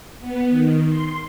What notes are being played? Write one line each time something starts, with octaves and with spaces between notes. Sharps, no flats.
B3
D#3
C6